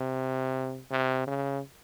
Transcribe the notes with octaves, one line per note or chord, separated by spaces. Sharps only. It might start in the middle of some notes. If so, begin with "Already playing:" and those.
Already playing: C3
C3
C#3